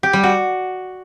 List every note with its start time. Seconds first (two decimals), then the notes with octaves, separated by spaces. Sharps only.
0.03 G4
0.13 G3
0.24 F#4